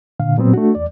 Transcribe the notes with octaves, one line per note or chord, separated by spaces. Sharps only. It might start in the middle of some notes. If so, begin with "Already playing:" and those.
A#2 D3 F5
A#2 F#3 B3 C4
A3 D4 F#4
E2 D5